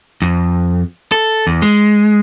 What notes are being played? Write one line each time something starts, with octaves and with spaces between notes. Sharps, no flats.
F2
A4
E2
G#3